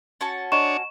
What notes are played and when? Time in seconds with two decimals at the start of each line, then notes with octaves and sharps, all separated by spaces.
0.21 C#4 F#4 A5
0.52 D4 C#5 D#5 A#5 C#6 E7